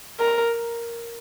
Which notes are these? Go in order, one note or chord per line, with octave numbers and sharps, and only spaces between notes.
A#4